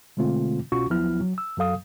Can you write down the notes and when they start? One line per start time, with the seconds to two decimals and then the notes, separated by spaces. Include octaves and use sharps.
0.17 B2 D3 G#3 A3 C4 F4
0.72 C2 B2 C#4 F4 F#4 C#6
0.90 D#2 F3 F#3 B3 E4 F6
1.20 F#3
1.38 E6
1.57 F#2 F#3 A4 F5 D#6